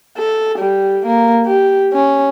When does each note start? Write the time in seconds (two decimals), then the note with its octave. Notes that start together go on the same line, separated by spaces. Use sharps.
0.18 A4
0.59 G3
1.06 A#3
1.46 G4
1.93 C#4